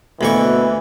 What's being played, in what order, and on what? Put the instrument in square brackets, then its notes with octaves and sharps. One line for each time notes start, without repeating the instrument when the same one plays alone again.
[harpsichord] D2 A#3 C#6 [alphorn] B2 [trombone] E3